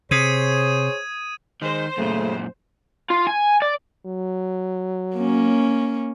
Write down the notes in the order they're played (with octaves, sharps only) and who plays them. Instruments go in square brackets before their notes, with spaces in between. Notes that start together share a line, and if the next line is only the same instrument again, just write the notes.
[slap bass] C3 [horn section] G#4 C5 C#5 [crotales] D#6 G#6 D#7
[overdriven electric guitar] D#3 [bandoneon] G#3 [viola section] C5
[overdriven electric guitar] F#2 A#2 [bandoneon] C#3 [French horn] A3
[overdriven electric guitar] F4
G#5
D5
[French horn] F#3
[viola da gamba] A#3 C#4